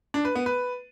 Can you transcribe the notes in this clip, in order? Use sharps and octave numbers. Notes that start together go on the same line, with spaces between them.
D4
B4
B3
B4